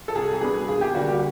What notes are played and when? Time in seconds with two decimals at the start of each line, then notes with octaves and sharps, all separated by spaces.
0.08 A4
0.15 C2 G#4
0.41 B2 G3 B3 D4 G#4
0.68 D#2 G#4
0.81 G4
0.95 D3 G3 A#3 F#4
1.08 G4